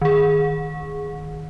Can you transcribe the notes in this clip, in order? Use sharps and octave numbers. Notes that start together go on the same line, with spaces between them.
D#3 G#4